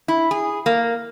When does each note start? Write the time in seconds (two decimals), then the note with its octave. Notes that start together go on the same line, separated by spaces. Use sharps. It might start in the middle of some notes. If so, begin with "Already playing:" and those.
0.08 E4
0.31 G#4
0.66 A#3